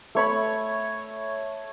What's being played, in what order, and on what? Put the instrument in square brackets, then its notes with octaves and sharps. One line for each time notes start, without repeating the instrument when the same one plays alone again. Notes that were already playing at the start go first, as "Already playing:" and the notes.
[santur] A3 C#5 B5